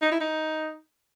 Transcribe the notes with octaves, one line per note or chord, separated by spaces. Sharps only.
D#4
E4
D#4